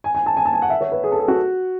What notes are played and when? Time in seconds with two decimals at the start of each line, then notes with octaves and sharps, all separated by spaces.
0.04 G#5
0.15 G#5
0.26 A5
0.37 G#5
0.45 A5
0.53 G#5
0.62 F#5
0.70 E5
0.81 C#5
0.92 B4
1.04 G#4
1.12 A4
1.19 G#4
1.28 F#4